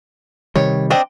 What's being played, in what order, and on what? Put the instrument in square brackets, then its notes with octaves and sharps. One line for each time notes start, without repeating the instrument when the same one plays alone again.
[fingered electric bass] C3 D#3 G3 [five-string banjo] C#5
[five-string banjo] C4 D4 D#5